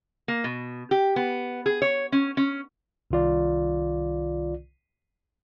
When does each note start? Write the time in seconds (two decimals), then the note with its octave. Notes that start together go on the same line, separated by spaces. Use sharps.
0.28 A#3
0.44 B2
0.91 G4
1.16 B3
1.66 G#4
1.82 C#5
2.12 C#4
2.37 C#4
3.11 C2 D#3 F4 D5